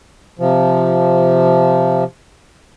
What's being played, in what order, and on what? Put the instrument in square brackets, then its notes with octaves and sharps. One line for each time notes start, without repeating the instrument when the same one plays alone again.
[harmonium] C3 F3